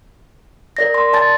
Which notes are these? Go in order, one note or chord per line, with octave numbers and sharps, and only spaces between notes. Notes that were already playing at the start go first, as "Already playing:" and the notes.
A#4 D5 A#6
C6
D5 A5 A6